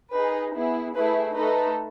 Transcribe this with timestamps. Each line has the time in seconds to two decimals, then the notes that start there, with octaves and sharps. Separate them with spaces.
0.12 D#4 G#4 B4
0.54 B3 E4 G#4
0.94 A3 E4 G#4 B4
1.35 A3 D#4 A4 B4